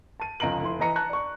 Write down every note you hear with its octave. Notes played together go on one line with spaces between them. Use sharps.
A5 D#7
F1 C#2 D#5 A#5 D7 F#7
F1 E4 C6
E3 B4 D#5 A#5 C#7
A5 A#5 F#6
D5 C#6